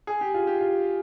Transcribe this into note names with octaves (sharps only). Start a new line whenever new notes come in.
G#4
G4
F4
G4
F4